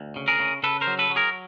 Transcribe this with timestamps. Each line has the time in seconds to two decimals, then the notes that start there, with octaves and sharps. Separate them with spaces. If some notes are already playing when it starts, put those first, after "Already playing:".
Already playing: D2
0.16 C#3
0.28 G#4 A#4
0.40 C#3
0.63 C#3 A4 B4
0.81 A#4 C5
0.87 F#3
0.99 A4 B4
1.10 F#3
1.16 G#4 A#4